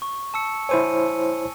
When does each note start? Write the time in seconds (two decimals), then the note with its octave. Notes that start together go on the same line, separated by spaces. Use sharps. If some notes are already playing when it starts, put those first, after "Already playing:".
0.02 C#6
0.34 A5 E6 C#7
0.69 E4 C5 C#5 G#5 E6 D#7